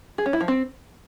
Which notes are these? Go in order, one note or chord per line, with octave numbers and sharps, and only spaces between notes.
G#4
C#4
E4
F3
C4